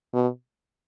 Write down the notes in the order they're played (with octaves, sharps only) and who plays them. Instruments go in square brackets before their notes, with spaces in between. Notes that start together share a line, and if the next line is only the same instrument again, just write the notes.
[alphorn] B2